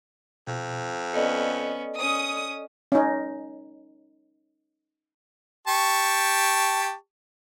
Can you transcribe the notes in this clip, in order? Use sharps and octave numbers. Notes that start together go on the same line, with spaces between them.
F2 B2
B3 C#4 A4 D5 D#5
C#4 D#6
C#4 D#4
G4 A5 C#6